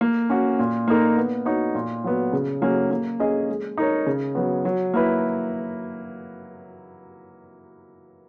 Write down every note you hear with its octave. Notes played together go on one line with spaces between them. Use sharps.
A#3
C#4 F#4
A#2
A#3 D#4 A#4
B3
D#4 F#4 C#5
A#2
F#3 B3
C#3
F#3 A#3 C#4 G#4
A#3
C#4 G#4 D#5
G#3
D#4 A#4 C#5
C#3
F#3 B3
F#3
A#3 E4 B4